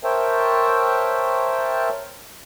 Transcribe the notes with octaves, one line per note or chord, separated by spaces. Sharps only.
A#4 C5 C#5 E5 G5 A5